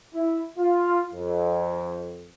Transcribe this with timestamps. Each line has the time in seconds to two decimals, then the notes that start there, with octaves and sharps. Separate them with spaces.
0.14 E4
0.58 F4
1.13 F2